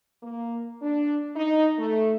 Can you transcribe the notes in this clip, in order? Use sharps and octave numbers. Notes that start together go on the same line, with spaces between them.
A#3
D4
D#4
A3